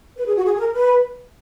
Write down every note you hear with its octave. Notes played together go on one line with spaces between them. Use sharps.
B4
G#4
F#4
G#4
G#4
A#4
B4